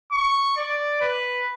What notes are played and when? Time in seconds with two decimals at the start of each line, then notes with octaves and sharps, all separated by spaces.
0.12 C#6
0.57 D5
1.01 B4